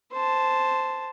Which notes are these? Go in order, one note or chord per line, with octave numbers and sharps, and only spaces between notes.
C5 A5